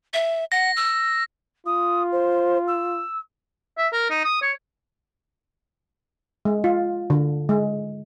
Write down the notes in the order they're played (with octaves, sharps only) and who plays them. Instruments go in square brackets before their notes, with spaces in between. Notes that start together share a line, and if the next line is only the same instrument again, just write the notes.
[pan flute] E5
[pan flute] F#5 [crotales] A#6
[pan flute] E6
[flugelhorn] F4 [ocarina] D#6
[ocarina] C5
E6
[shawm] E5
A#4
D#4
D#6
C#5
[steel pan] G#3
F4
D3
G#3